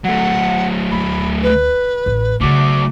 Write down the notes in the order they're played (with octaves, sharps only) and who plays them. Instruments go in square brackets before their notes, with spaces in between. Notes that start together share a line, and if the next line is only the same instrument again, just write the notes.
[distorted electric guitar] F#3 A3 [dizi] F#5
[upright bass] D2 [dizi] B5
[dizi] B4
[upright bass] A1
[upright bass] C#3 F#3 [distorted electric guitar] A3 F#4 [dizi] D6